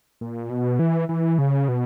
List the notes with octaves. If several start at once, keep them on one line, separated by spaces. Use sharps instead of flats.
A#2
B2
E3
E3
C#3
B2